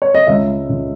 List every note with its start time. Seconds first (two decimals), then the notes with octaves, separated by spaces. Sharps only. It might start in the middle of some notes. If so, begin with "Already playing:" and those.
0.02 C#5
0.15 D#5
0.27 C#2 C#3 G#3 E5
0.69 C#2 C#3 G#3